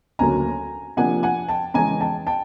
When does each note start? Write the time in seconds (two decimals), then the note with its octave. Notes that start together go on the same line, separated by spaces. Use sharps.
0.19 D2 C#3 F#3 A#3 C#4 G#5 A#5
0.97 C3 F3 A#3 D4 F#5 G#5
1.23 F#5 G#5
1.48 G5 A5
1.74 C#3 E3 G#3 B3 G#5 A#5
2.01 G5 A5
2.27 G5 A5